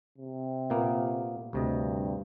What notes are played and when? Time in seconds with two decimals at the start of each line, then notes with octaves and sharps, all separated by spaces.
0.18 C3
0.70 A#2 A#3 B3
1.53 D2 G2 C3 D#5